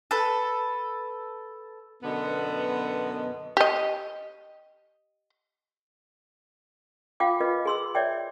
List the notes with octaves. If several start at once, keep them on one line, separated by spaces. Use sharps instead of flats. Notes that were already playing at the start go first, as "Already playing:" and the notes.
A4 B4
F#2 B2 D3 B3
G4 D#5
F4 F5 G5 D6
F4 B4 D#5
G#4 C6 E6
C#5 D5 E5 G5